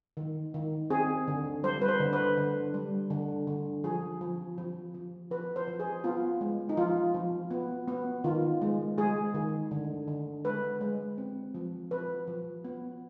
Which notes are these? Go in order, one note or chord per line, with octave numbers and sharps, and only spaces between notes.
D#3
D#3
C4 G#4
D3
G3 C5
B4
C5
D3
B4
D3
G3
D3
D3
F3 G#4
F3
F3
F3
F3 B4
C5
F3
G#4
B3 F4
G#3
D#4
F3 F4
F3
B3
B3
D#3 F4
G#3
G#3 G#4
D#3
D3
D3
G#3 B4
G#3
C4
F3
F3 B4
F3
B3